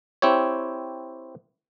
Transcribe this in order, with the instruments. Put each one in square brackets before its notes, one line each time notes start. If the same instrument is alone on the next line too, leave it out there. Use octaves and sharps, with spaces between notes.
[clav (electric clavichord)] C4 E4 G4 C#5